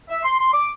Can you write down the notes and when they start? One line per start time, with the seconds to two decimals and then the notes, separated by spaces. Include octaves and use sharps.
0.09 E5
0.24 C6
0.38 C6
0.53 D6